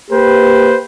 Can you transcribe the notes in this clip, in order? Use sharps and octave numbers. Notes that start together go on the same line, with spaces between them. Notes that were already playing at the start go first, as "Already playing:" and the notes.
A#3 G4 B4 C5